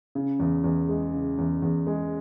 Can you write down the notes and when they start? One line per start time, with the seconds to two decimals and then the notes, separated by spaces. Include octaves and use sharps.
0.15 C#3
0.40 E2
0.64 E2
0.89 G#3
1.14 C#3
1.38 E2
1.62 E2
1.87 G#3